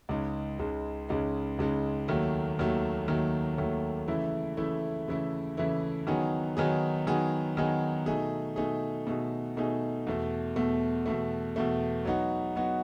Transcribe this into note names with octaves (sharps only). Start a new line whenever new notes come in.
C#2 C#3 G#3 D#4
C#2 C#3 G#3 D#4
C#2 C#3 G#3 D#4
C#2 C#3 G#3 D#4
D#2 D#3 F#3 A3
D#2 D#3 F#3 A3
D#2 D#3 F#3 A3
D#2 D#3 F#3 A3
C#3 E3 A3 E4
C#3 E3 A3 E4
C#3 E3 A3 E4
C#3 E3 A3 E4
D#3 F#3 B3 D#4 G#4
D#3 F#3 B3 D#4 G#4
D#3 F#3 B3 D#4 G#4
D#3 F#3 B3 D#4 G#4
B2 A3 D#4 G#4
B2 A3 D#4 G#4
B2 A3 D#4 G#4
B2 A3 D#4 G#4
E2 B2 A3
E2 B2 A3
E2 B2 A3
E2 B2 A3
F#3 B3 D#4 F#4
F#3 B3 D#4 F#4